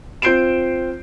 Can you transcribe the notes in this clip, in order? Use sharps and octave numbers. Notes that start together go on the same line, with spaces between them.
C4 F4 G6 C7 D7 E7